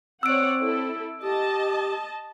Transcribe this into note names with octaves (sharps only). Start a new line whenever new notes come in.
C4 C#5 D5 F#5 E6 D7
E4 A4
G4 D#5 A5